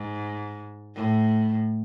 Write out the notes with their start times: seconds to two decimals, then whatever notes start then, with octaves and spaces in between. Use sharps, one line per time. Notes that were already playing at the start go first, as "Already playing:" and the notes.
Already playing: G#2
0.95 A2